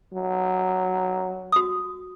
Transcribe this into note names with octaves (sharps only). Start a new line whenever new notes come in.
F#3
F#4 D#6